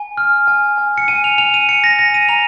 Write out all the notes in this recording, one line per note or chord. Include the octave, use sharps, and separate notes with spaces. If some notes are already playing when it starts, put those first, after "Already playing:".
Already playing: G#5
F6
G#5
G#5
C#7
G#5 D#7
F7
G#5 F7
D#7
G#5 C#7
A#6
G#5 A#6
D#7
A#5 F7